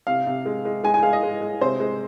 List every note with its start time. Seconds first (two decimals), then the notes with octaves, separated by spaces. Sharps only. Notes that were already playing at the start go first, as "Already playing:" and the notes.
0.07 C3 F5
0.27 C3
0.46 G#3
0.65 G#3
0.84 G#3 G#5
0.94 G#5
1.03 G#3 F5
1.13 D#5
1.23 G#3
1.41 G#3
1.61 C3 C5
1.80 G#3